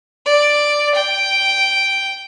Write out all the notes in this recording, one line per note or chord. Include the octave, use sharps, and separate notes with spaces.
D5
G5